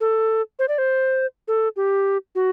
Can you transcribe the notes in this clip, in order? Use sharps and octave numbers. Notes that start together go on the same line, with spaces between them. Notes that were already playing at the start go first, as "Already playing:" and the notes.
A4
C5
D5
C5
A4
G4
F#4